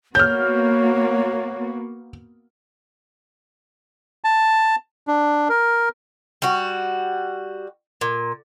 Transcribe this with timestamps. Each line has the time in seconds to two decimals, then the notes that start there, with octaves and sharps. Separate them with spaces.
0.15 A#3 B3 F#4 C#5 F6 G6
4.24 A5
5.07 D4
5.49 A#4
6.42 G3 F#4
8.01 A#2